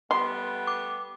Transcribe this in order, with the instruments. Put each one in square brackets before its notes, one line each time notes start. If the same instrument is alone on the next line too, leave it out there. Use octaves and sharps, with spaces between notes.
[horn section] G3 A3 B3 [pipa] C6
[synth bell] D6